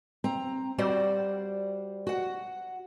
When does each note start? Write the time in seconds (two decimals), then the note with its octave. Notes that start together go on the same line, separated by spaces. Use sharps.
0.24 C4 A#5
0.78 G3 F#4 C5 D5
2.07 F#4 F#5